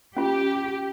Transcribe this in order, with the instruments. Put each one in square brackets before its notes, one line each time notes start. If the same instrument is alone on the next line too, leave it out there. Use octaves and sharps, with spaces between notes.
[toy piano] C#4 F4 [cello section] G4